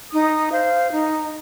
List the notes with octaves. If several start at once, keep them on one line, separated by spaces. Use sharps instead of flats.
D#4 D#6
C5 F5
D#4